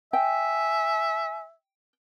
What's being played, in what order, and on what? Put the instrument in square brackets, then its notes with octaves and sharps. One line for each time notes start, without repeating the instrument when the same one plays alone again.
[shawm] E5 [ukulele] G5 [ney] G#5